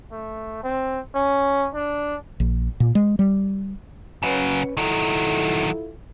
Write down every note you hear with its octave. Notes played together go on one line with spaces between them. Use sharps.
A3
C4
C#4
D4
A#1
A#2
G#3
G3
C#3 F#3 C#4 B4
D#3 F#3 E4 F4 A4